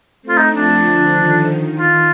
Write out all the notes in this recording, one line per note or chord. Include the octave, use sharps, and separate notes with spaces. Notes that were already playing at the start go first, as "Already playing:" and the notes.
A3 C4
F4
D#4
F3 A3 D4
D3 F3
D#3
D#3
F4